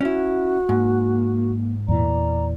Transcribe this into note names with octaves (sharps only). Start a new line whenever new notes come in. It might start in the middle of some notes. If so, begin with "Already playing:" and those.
C#4 E4 F#4
G#2 A#3
E2 A#2 E3 D5 A#5